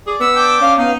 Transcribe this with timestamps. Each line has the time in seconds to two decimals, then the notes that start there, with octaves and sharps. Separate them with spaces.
0.07 G#4 D5
0.20 B3 E6
0.34 D4 G5 D6
0.61 C#4 F5
0.77 B3 D#4 F5